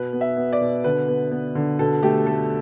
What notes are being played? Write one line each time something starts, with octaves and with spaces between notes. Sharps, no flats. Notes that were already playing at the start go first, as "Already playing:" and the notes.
Already playing: B2 B4
B3
E5
B3
D5
B2
D3 B4
B3
B3
D3
B2 A4
A3 G4
A3 A4